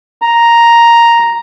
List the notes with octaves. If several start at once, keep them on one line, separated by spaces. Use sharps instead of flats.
A#5